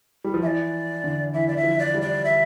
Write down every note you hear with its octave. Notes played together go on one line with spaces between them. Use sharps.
G3
F3
E3 D5 E5
D3
E3 E5
D5
E3 E5
F3
D5
G3
D5
E5